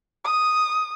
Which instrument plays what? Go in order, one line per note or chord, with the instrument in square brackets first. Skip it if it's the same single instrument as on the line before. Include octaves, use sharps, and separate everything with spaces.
[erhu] D#6